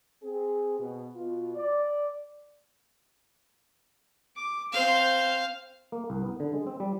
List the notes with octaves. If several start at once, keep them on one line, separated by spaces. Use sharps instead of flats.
C4 G#4
B2
B2 F4
D5
D6
C4 C5 F5
A#3
C2
B3
D3
G#3
C4
G3